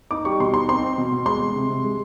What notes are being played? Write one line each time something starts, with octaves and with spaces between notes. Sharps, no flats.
D#4 D6
G3 C#6
B2 C6
D#4 C6
C4 C6
C4
B2
B2
G#3 C6
G#3
C3
C3
G#3